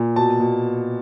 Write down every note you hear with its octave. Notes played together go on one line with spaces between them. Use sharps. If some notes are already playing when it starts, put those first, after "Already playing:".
Already playing: A#2
B2 A5
B2